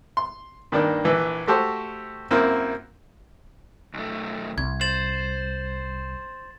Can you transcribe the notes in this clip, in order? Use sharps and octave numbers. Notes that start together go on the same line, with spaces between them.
C6
G2 D#3 A#3 D4
A#1 E3 B4
A3 F#4 G4 A4 C5
F#2 A#3 C4 E4
B1 A3
C2 G#6
C5 A6 E7 F#7